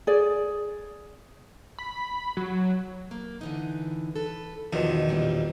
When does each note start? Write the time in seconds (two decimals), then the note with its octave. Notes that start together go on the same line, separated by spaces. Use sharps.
0.07 G#4 D5
1.79 B5
2.37 F#3
3.11 A#3
3.41 D3 E3 D#4
4.16 A4 B4
4.73 E2 B2 D#3 F3
5.09 A#2 G3 C4